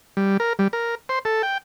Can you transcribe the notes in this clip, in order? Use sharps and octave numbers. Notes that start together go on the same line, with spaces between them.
G3
A#4
G3
A#4
C5
A4
G5